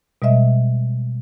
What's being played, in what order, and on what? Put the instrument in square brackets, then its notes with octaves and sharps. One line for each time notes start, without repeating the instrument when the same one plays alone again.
[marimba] B2 G3 G#3 D#5 E5